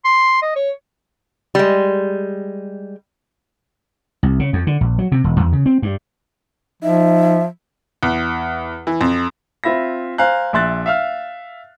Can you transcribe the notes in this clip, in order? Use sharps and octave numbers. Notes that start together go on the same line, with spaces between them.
C6
D#5
C#5
G3 G#3
C2
C#3
F2
D3
A#1
F#3
C3
E1
E2
C#3
C4
G2
F3 D#4 E5
E2
E3
F2
C4 F4 E5 B5 A#6
C5 F5 G#5 A#5 F#6
A#1 E5 C6 F#6 A6
E5 F5 F6